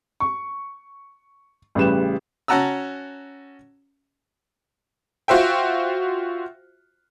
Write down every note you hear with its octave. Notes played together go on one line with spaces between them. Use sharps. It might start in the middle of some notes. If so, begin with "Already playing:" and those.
C#6
A1 C#3 G3 B4 E7
C#4 F#4 F#5 A5 A#5 E6
F4 F#4 C5 E5 G5